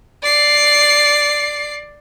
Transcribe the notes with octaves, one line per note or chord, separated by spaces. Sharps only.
D5 C7